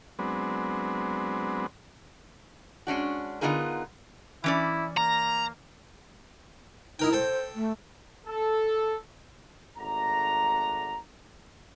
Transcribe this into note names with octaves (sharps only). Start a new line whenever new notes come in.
F#3 G#3 B3 C4 D4
G#3 C#4 D4 F#4
D3 B3 D#4 F4 G#4 A#4
E3 C#4 E4 D5
A#3 A#5
D#4 E4 A#4 G5
A4 C5 G5
A3
A4
G#1 A3 D5 F#5 A#5